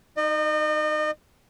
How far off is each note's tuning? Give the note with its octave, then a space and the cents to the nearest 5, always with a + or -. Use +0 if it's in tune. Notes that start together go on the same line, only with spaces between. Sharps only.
D#4 +0 D#5 -35